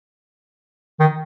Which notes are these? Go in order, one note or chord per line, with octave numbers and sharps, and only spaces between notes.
D#3